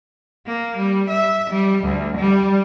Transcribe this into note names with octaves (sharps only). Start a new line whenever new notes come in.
A#3
G3
E5
G3
D2
G3